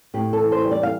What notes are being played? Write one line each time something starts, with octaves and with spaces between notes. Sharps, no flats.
A2 G4
A4
E3
C5
G3
D5
F5